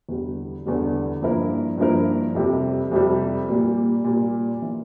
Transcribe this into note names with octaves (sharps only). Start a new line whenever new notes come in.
E2 D3 G3
E2 D3 G3
G2 F3 A#3 E4 A#4
G2 F3 A#3 E4 A#4
F2 C3 G3
F2 C3 G3
A#2 G3 A#3
A#2 G3 A#3
E3 A#3